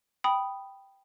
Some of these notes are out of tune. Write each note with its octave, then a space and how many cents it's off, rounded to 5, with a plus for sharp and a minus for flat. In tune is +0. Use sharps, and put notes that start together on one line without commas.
G5 +0 B5 +0 D#6 +0